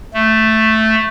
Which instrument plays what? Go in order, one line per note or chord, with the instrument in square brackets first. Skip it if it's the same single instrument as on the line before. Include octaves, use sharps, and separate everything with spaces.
[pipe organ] A3